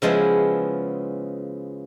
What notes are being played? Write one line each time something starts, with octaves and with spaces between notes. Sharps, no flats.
C#3 F3 G#3 B3 E4